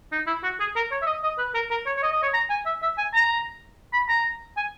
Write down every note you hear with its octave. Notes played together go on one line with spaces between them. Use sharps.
D#4
E4
F#4
G#4
A#4
C#5
E5
D#5
D#5
B4
A#4
A#4
C#5
C#5
D#5
D#5
C#5
A#5
G#5
E5
E5
G#5
A#5
B5
A#5
G#5